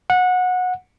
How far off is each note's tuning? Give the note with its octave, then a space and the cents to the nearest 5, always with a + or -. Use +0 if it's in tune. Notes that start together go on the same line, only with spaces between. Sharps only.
F#5 -20